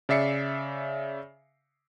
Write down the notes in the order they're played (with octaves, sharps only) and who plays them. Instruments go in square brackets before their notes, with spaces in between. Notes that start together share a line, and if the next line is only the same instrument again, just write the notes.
[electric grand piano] C#3 D5 E5 C7 C#7